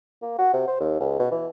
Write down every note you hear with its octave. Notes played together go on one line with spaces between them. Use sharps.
A#3
F#4
C3
C5
D#2
C#2
B2
E3